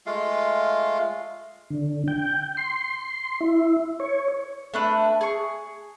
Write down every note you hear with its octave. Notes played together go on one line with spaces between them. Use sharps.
G#3 A3 F4 F5
D3
G5
C6
E4
C#5
A3 D4 B4
G#4 C#6